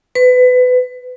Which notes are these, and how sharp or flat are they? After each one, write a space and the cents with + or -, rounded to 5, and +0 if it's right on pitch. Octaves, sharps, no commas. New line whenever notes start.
B4 +25